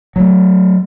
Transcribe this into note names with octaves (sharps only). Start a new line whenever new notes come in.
F#3 A3